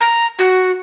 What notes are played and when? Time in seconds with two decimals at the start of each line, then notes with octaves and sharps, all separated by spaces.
0.01 A#5
0.39 F#4